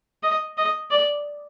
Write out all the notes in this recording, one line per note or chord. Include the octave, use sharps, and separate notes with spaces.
D#5
D#5
D5